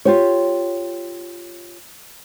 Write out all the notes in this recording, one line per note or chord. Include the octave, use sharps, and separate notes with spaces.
F4 G4 C#5